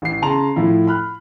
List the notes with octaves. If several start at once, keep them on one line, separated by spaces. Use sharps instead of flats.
A1 C7
C#3 A5 A#5 C6 F7
A2 F3 E4
B5 F6 F#6